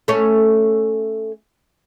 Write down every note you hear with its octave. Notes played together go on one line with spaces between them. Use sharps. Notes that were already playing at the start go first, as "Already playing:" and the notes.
A3 C#4